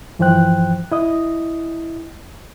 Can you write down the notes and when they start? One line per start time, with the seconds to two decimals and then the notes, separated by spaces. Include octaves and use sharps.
0.19 G2 E3 F3 C5 G5 F#6
0.92 E4 D#5 D#6